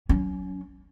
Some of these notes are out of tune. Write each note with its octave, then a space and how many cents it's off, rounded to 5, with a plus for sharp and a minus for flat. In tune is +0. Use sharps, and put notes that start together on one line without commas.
F#3 +0 C#4 +25